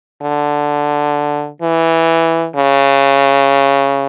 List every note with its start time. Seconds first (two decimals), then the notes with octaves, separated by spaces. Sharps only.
0.22 D3
1.62 E3
2.56 C#3